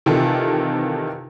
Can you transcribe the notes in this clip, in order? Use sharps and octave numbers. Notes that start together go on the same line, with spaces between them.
C3 D#3 E3 F4 G4 A4